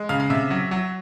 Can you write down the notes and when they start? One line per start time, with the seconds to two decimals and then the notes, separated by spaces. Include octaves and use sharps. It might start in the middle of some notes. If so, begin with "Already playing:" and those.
Already playing: G#3
0.09 C#3 F5
0.20 F5
0.30 C3 E5
0.50 F#3
0.71 F#3